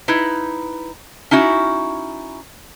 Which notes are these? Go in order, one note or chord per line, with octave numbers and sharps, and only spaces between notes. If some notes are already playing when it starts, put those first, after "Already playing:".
D#4 E4 B4
C#4 D#4 E4 F#4